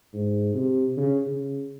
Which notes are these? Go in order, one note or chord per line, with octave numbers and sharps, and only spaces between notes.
G#2
C3
C#3
C#3